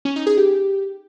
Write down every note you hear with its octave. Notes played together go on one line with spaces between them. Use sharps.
C#4
D#4
G#4
G4